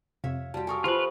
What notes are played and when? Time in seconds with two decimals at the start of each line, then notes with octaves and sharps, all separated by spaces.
0.24 F2 C3 C#5 E5 F5
0.54 G3 F#4 G4 A5
0.67 A4 A#4 F5 G#5 C#6 D#6
0.84 F3 F4 G4 B4 E5 B5